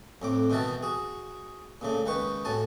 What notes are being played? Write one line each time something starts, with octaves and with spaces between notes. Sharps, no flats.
F2 A2 D6
B2 D#3 E3 F#4 E5 A5
F#4 G#4
A#2 C#3 A3
C#2 D#3 B4 C#6
A2 F#4 G#5 A5